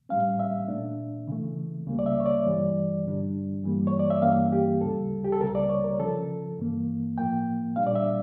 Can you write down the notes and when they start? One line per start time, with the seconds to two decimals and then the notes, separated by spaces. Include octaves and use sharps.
0.09 A2 G3 C#4 F5
0.39 E5
0.68 A#2 A3 D4
1.27 C#3 E3 A3
1.86 C#2 C#3 G3 A#3
1.99 D5
2.06 E5
2.20 C#5
2.26 D5
2.45 G2 E3 G3
3.04 G2 D3 G3 D4
3.63 G2 E3 G3 A#3
3.87 C#5
3.99 D5
4.10 E5
4.22 G2 E3 G3 A#3 C#4 F5
4.52 G4
4.81 D2 C#3 G3 A4
5.24 G4
5.32 A4
5.40 C#2 C#3 G3 A#4
5.55 D5
5.69 C#5
5.84 A#4
5.99 C#3 F3 C#4 A4
6.58 G2 E3 A#3
7.17 A2 F3 A#3 G5
7.76 A#2 G3 D4 F5
7.87 D5
7.95 E5